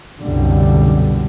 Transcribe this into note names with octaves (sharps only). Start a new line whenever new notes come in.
C2 F#2 B2 D3 G3